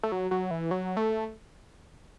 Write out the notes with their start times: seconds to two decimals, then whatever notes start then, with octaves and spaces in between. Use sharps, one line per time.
0.03 A3
0.12 F#3
0.31 F#3
0.51 E3
0.71 F#3
0.97 A3